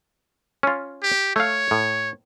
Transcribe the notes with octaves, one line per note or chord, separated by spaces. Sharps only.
C#4 F4
G4
A3 C#5 F5
A2